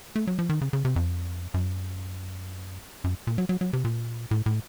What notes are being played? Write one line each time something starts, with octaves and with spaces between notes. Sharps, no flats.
A3
F#3
F3
D#3
C#3
C#3
C3
F2
F#2
F#2
A#2
F#3
F#3
F#3
C3
A#2
A2
A2